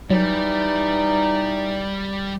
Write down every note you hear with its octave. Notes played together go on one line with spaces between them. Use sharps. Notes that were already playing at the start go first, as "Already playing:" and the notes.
E3 F#3 G3 D#4 D5